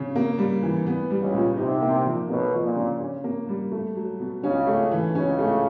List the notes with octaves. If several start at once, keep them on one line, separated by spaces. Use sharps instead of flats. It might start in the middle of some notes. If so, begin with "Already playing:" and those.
Already playing: C#3
A#3
G3
E3
B3
G3
C#2 C#3
A#2
C2 C3 D#4
A#3
F3
B1 B2 A#3
F3
A#2
C#3
C#4
A#3
G3
A3
F#3
B2
C#2 C#3 C#4
A3
E3
C#2 C#3 C#4
A3